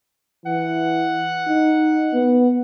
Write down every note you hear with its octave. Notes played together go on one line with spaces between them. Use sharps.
E3 F#5
D#4
B3